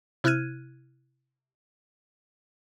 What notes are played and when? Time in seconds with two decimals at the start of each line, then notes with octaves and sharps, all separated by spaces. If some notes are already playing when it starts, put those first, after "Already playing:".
0.24 C3 E4 F6 F#6 G#6 D#7